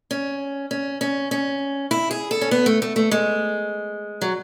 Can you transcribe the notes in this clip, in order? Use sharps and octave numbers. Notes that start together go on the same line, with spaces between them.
C#4
C#4
C#4
C#4
E4
G#4
A4
C#4
B3
A3
A3
A3
G#3
F#3